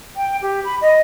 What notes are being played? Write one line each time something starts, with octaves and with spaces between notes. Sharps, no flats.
G5
G4
B5
D#5